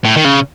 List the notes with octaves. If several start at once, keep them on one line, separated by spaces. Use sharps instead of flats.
A2
D#3
C#3